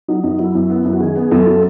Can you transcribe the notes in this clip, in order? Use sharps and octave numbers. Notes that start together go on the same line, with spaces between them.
F#3 D#4
F#2 D#4
F#3 E4
F#2
B3
F#2
F#4
D#3 G#4
B3
F#2 A4
F#3